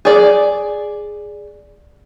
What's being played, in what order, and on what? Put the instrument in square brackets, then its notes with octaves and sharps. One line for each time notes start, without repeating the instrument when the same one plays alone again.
[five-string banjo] G#4 D5